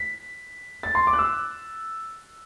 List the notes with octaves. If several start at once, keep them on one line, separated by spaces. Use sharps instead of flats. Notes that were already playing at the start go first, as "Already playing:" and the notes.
Already playing: B6
A6
C6
D6
F#6
E6